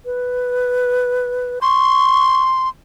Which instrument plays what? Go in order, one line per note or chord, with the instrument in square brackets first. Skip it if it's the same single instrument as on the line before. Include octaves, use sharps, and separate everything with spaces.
[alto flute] B4
[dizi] C6 [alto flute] C#6